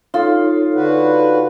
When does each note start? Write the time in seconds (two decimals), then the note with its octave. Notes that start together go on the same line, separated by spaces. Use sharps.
0.14 D#4 F4 A4 C#5
0.74 D3 F#4 B4